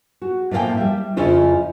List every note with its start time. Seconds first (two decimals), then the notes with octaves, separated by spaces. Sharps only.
0.22 F#4
0.51 A2 F3 A#3 A4 F5 G5
0.77 G3 E5
1.17 F2 C#3 C#4 E4 F4 C5